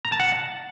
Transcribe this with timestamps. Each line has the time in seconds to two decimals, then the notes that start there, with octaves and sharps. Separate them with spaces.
0.05 A#5
0.12 A5
0.20 F#5